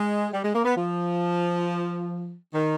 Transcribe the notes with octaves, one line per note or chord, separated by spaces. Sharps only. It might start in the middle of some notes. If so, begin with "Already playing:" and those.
Already playing: G#3
G3
G#3
A#3
B3
F3
D#3